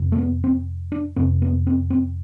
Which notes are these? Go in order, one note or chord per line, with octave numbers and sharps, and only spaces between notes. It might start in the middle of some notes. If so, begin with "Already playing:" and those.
Already playing: F2 C3
A3
B3
C4
D4
F2 C3 C4
B3
C4
C4